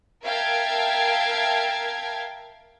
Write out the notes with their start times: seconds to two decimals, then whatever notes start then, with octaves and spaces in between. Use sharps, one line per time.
0.24 A#4 E5 F5 G5 A5 G#6